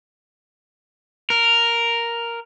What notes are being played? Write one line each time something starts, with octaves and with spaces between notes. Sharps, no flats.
A#4